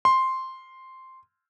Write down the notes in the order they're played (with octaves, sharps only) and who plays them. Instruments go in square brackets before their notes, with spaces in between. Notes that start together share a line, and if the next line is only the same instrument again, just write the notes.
[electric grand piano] C6